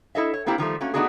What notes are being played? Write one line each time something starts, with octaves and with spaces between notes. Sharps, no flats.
E4 A4 D#5 E5
C#5
A3 A#3 C4 E4 G4
D#3 F3 G3 A3
A3 A#3 C#4 F#4
A3 B3 D4 D#4 F#4 G#4